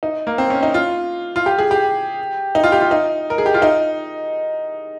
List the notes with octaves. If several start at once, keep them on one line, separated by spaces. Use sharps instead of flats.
D#4
A#3
C4
C#4
D#4
F4
F4
G4
G#4
G4
D#4
F4
G4
F4
D#4
A#4
G#4
G4
F4
D#4